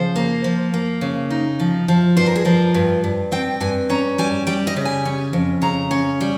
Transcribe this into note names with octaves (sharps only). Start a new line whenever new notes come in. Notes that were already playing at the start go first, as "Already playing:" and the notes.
Already playing: C#3 F3 C5
A#3
F3
A#3
C#3
D#4
F3
F3
G2 C5
A#4
G#4
F3 A#4
G2
G2
C4 G5
G2 G#5
C#4 A#5
G3 G#5
G3 G5
D#5
C#3
G#5
C#4
F2
C#3 A#5
C#4
G3